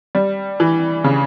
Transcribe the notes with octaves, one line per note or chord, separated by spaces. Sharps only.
G3
E3
C#3